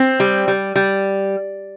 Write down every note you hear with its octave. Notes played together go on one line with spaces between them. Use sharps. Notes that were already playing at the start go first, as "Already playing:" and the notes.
Already playing: C4
G3
G3
G3